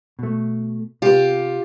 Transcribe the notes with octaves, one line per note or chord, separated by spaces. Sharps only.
B2 A3
C3 F4 G4 B4